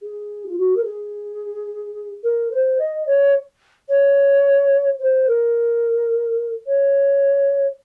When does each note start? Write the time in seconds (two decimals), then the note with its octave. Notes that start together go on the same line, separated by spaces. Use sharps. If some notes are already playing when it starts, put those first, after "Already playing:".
0.02 G#4
0.46 F4
0.58 F#4
0.76 A#4
0.84 G#4
2.24 A#4
2.51 C5
2.78 D#5
3.06 C#5
3.89 C#5
4.99 C5
5.27 A#4
6.66 C#5